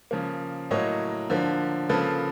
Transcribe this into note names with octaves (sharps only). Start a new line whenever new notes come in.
C#3 F3 A#3
A2 F#3 A#3 C#5 D#5
D3 F3 A#3
C#3 F3 A#3 A4 B4